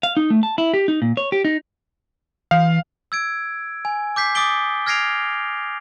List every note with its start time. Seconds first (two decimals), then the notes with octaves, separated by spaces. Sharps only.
0.03 F5
0.17 D#4
0.30 A3
0.43 A5
0.58 E4
0.74 G4
0.88 D#4
1.02 A#2
1.17 C#5
1.32 G4
1.45 D#4
2.51 E3 F5
3.12 E6 G#6 D7
3.85 G#5
4.16 D6 G6 B6 C7
4.35 D6 D#6 A6 B6 D7 G7
4.86 F6 G#6 A#6 C7 D7 F7